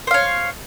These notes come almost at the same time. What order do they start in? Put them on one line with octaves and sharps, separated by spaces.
C5 F5 C#5